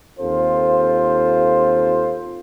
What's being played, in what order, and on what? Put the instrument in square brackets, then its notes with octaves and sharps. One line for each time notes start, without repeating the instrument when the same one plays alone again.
[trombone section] D#2 C4 F4 A4 C5